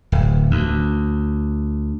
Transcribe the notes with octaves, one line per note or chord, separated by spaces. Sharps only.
D1
D2